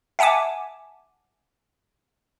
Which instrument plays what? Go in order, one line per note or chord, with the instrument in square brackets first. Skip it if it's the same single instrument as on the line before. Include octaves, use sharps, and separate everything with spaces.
[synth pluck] E5 F#5 G#5 A5 D6